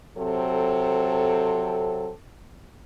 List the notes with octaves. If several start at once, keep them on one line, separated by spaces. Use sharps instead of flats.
C3 F#3 C4 A4